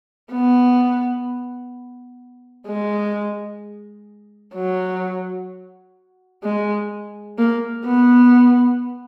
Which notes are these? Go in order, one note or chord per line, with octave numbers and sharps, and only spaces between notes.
B3
G#3
F#3
G#3
A#3
B3